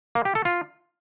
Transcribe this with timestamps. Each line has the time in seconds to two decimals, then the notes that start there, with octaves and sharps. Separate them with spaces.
0.15 A#3
0.25 G4
0.35 A4
0.45 F4